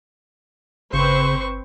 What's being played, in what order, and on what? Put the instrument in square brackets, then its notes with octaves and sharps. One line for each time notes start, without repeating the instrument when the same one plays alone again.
[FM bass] G1 [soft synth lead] C#3 [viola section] C4 B4 C5 [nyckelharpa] C#6